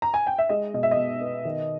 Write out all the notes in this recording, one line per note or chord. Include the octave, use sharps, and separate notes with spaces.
A#5
G#5
G5
E5
G#3 D#5
B2 D#5
E5
D#5
B2
B3
D#3